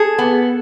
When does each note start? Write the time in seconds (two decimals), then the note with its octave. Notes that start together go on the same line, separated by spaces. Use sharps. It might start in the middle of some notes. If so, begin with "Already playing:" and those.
Already playing: G#4 A4
0.18 B3